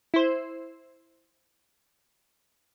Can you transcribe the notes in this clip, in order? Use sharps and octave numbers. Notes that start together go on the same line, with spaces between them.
E4 C5